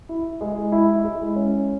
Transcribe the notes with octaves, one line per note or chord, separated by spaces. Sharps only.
E4
G#3
E4
G#3
C#4